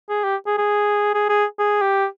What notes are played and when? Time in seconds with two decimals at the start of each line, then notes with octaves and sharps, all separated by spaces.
0.09 G#4
0.24 G4
0.46 G#4
0.58 G#4
1.14 G#4
1.29 G#4
1.59 G#4
1.82 G4